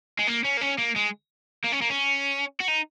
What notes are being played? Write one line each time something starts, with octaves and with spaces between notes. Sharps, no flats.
G#3
A#3
C#4
A#3
C#4
A#3
G#3
A#3
C#4
A#3
C#4
F#4
D#4